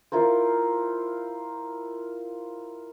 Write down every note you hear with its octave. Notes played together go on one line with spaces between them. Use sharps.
E4 F4 A#4 C5